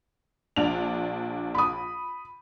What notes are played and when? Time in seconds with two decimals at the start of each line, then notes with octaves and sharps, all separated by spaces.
0.56 A#1 D4 F7
1.55 B5 D#6